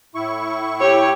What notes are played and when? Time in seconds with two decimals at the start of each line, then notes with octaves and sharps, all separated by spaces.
0.15 A2 E4 C#6
0.80 G4 C#5